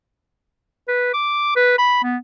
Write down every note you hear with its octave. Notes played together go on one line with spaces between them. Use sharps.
B4
D6
B4
B5
B3